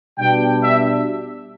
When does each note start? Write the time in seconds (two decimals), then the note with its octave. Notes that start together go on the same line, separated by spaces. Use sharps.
0.18 B2 G3 D4 G5
0.62 E5